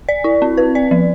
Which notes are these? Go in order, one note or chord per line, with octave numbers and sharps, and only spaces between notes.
D5
E4
C4
B4
D5
F3